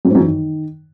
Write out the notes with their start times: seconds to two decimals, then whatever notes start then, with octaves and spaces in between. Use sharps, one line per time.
0.05 F#2
0.10 G#2
0.15 F#2
0.20 E3
0.25 D#3